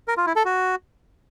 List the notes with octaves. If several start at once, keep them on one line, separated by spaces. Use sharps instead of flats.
A#4
F4
E4
A4
F#4